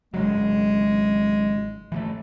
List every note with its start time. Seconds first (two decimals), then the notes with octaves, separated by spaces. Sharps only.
0.14 G#1 C#3 F#3 G#3
1.92 E3 F3 A3